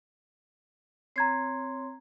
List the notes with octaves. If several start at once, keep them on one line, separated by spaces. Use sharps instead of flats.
C4 C#5 A#5 C6 G#6 C7